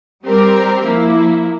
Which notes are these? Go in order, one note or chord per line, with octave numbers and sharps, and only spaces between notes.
G3 C4 G4 A#4
F3 A#3 E4